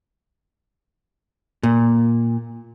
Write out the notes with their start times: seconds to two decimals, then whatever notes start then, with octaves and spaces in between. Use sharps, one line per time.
1.63 A#2